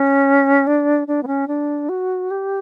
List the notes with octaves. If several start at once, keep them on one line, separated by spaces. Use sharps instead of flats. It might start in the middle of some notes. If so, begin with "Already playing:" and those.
Already playing: C#4
D4
D4
B3
C#4
D4
F#4
G4